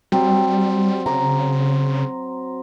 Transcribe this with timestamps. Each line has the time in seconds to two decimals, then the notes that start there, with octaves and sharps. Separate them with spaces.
0.12 F#3 G3 C4
1.06 C#3 A#5 D6